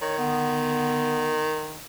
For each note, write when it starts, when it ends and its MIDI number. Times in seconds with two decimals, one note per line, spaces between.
0.02 1.83 51
0.02 0.18 73
0.18 1.47 50
0.18 1.47 59